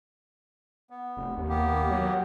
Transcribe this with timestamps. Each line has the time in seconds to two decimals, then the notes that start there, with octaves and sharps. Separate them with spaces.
0.90 B3
1.17 F1
1.36 D#2
1.49 A#3 B3 G4
1.91 F#3